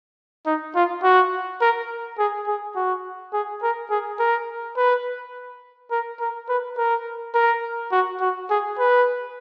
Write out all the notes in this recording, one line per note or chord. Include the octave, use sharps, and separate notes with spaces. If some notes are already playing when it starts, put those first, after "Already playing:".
D#4
F4
F#4
A#4
G#4
G#4
F#4
G#4
A#4
G#4
A#4
B4
A#4
A#4
B4
A#4
A#4
F#4
F#4
G#4
B4